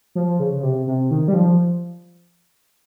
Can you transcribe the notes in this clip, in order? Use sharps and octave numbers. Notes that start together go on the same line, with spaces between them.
F3
C#3
C#3
C3
C3
D#3
G3
F3